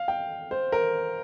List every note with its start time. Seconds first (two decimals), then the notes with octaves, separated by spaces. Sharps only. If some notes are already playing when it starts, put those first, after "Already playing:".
Already playing: F5
0.08 G5
0.51 C5
0.72 A#4